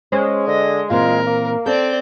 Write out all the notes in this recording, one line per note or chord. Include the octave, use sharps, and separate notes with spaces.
G#3 C#4 C5
D3 D#5
A#2 E3 C4 F4 A#4
A#3
C4 A4 D5 G6